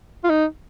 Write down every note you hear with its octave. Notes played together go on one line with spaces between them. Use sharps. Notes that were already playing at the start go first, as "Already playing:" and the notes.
F4
D#4